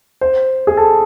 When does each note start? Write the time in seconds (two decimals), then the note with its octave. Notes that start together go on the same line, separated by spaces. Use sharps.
0.21 C5
0.67 G#4
0.77 A4